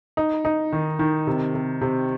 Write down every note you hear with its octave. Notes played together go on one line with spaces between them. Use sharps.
D#4
D#4
D#3
D#3
C3
C3
C3